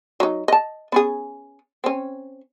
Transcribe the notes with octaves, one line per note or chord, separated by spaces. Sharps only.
F#3 D#4
D#5 A5
B3 C#4 G#4
C4 C#4